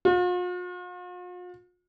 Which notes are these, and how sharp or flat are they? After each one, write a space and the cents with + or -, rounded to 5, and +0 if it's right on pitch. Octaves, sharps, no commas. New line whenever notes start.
F4 +45